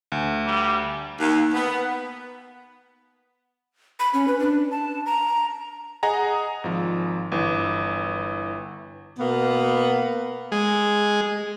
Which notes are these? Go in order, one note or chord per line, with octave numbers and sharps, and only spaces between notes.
D2
G3
D#2
B3
B5
C#4
B4
D4
A5
A#5
G#4 D#5 F#5 G#5 A#5
G#1 F3
G1 E3
B2 A#3 B3
G#3